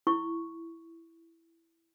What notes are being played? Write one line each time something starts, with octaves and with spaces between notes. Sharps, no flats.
E4 C#6